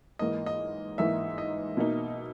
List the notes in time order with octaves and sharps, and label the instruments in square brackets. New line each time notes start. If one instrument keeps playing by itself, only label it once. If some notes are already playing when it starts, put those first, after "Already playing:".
[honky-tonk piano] G#2 E3 A#3 D#4 [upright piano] D#5
[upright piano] D#5
[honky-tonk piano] G#2 E3 A#3 D#4 [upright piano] E5
[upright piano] D#5
[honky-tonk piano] B2 A#3 D#4